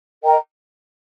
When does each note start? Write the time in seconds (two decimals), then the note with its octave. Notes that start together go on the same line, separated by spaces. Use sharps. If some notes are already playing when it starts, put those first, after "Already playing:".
0.23 A#4 D#5 G5 A#5